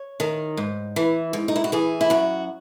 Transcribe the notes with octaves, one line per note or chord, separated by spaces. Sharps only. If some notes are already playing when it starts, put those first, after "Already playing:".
Already playing: C#5
D#3
G#2
E3
G#2
D#4
E4
F#4
E3 G#4
E4
F#2 F#4